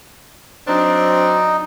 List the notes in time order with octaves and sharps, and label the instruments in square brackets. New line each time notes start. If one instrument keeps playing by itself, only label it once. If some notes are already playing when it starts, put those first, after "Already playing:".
[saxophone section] F#3 C4 D4 [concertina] D#4